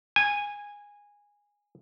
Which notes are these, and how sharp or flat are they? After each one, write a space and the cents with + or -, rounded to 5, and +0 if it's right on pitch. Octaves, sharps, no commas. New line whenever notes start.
G#5 -15